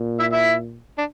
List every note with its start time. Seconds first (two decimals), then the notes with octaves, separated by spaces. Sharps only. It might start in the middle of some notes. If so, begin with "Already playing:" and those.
Already playing: A#2
0.19 E4 E5
0.33 E4 E5
0.98 D4